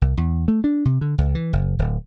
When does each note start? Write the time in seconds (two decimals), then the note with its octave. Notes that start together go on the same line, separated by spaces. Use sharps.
0.01 C2
0.17 E2
0.48 A3
0.64 D4
0.85 C3
1.01 D3
1.18 C#2
1.35 E3
1.53 F#1
1.79 D1